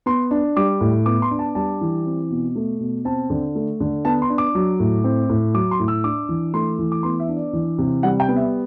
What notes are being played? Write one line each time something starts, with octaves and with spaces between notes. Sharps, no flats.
B3 C6
D4
G3 D6
A2
B3 D6
C6
D4
A5
G3 A5
E3
C4
B2
A3
B2
C4 A5
D3
A3
D3
B3 A5
C6
D4
D6
F#3
A2
C4
A2
F#3 D6
C6
A2
E6
D4 D6
E3
A3 C6
E3
D6
B3 C6
E5
D4
D5
E3
C3
G3 F#5
G5
B3
E5